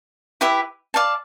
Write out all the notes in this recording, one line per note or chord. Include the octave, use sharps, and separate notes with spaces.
E4 G4 B4 E5
D5 F5 A5